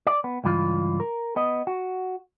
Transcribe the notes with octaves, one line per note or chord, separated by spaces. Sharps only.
D5
B3
C#2 G2 E3 F4
A#4
B3 D#5
F#4